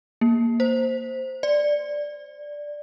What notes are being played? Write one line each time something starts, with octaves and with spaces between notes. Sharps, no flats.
A#3
C5
D5